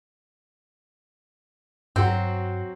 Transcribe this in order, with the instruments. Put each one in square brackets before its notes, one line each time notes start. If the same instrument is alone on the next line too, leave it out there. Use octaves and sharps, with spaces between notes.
[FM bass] G2 [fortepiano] F#3 F#4 C5 [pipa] C4